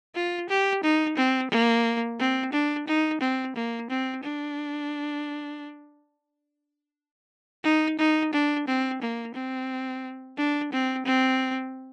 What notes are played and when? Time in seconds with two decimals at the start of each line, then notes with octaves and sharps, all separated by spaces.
0.15 F4
0.49 G4
0.83 D#4
1.17 C4
1.51 A#3
2.20 C4
2.53 D4
2.88 D#4
3.21 C4
3.56 A#3
3.90 C4
4.23 D4
7.64 D#4
7.99 D#4
8.33 D4
8.67 C4
9.02 A#3
9.35 C4
10.38 D4
10.72 C4
11.06 C4